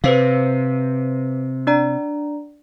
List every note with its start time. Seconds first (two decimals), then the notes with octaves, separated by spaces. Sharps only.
0.04 C3 B4 C5 F5
1.67 D4 D5 A#5